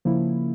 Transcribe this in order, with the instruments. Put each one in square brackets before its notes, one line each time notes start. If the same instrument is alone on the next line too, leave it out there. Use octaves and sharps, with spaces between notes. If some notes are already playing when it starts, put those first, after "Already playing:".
[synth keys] C#3 F3 A#3 E4